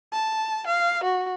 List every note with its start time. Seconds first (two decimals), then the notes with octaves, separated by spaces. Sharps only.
0.13 A5
0.67 F5
1.04 F#4